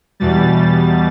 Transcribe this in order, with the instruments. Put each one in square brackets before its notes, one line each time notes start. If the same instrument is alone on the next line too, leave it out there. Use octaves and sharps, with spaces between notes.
[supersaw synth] E2 B2 G3 A6